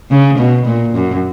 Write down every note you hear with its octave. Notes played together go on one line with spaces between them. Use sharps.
C#3
B2
A#2
F#2